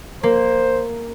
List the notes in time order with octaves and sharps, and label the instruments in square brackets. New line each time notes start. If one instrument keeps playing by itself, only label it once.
[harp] A#3 [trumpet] C5